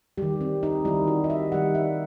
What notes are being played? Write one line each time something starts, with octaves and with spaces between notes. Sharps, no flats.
D#3 G3 G4
C4
D#4
D#3 G3 E4
F#4
D#5
E5
D#3 G3 F#5
E5